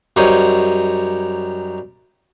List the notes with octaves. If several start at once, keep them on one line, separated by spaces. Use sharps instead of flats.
F#2 G3 D#4 C5 C#5 D#5